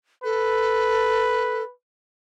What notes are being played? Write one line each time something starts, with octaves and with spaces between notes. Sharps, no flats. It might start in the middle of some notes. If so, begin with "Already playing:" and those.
A4 B4